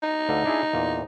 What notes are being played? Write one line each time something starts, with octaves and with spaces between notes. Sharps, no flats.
D#4
D2 D3 F5
D4 E4 G#4
E2 A#2